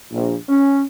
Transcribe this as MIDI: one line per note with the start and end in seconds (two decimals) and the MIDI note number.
0.12 0.34 34
0.49 0.83 61